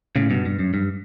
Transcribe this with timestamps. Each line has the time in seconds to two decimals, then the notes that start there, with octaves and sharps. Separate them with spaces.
0.16 A2 C#3
0.30 G2 B2
0.46 G2
0.59 F#2
0.74 G2